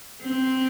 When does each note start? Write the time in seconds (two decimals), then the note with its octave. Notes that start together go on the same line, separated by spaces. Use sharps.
0.22 C4